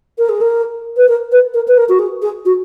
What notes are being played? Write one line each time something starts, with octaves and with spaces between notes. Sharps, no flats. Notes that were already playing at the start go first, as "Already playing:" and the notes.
A#4
G#4
A#4
B4
A#4
B4
A#4
B4
A#4
F#4
G#4
G#4
F#4